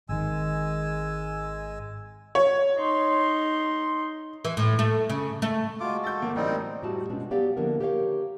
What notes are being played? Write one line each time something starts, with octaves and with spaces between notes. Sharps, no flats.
G#1 D#3 G#3 G#5 E6
C#5
D#4 C6
E3
A2
A3
C#3
A3
G#3 F4 F#4 D6
A4 G6 A6
G1 A#3
A1 G3 C4 D#4 A#4 C5 G5
A2 G3 A3 F#4 A5
B2 G#3 C#4 D4 F4
F#3 B3 G4 C#5 D5 F5
D3 F3 A#3 B3 E4 A#4
D#4 G4 A#4 B4 C#5 F5